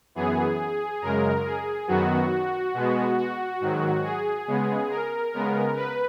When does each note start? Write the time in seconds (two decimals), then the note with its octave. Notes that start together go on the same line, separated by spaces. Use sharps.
0.15 F#2 E3 B3 G#4
1.02 F#2 C#3 G#3 A#4
1.45 G#4
1.88 F#2 D#3 F#3 B3 F#4
2.74 B2 G#3 B3
3.18 F#4
3.61 G#2 D#3 F#3
4.04 G#4
4.47 C#3 G#3 B3
4.90 A#4
5.33 C#3 G#3 B3 A#4
5.76 B4